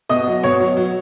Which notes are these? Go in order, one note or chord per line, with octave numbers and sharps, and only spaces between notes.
B2 D#5 D#6
F#3
B2 C#5 C#6
F#3
F#3